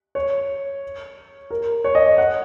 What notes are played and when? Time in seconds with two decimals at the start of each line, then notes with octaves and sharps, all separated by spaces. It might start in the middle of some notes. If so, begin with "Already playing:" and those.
0.15 C#5
1.51 A#4
1.84 C#5
1.95 D#5
2.18 F#5